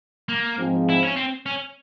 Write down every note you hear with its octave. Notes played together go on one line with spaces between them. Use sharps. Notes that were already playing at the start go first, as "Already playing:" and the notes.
A#3
G#2 F3 C4
E4
C#4
C4
C#4